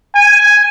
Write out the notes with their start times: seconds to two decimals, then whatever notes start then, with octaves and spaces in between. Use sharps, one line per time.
0.15 G#5